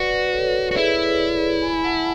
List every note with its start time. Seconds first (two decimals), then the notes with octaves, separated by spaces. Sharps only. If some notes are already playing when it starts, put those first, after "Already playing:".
Already playing: F#4 B4 D5
0.26 B4
0.33 A4 C#5
0.71 F#4
0.76 E4 G#4 B4
1.19 B4 D5
1.62 G#5 B5
1.84 F#5 A5